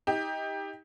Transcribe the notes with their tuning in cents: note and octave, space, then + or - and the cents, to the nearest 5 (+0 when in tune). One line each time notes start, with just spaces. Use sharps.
D#4 +30 G4 +15